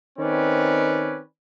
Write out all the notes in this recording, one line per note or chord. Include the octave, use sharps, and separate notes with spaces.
D#3 C4 C#4 B4 D5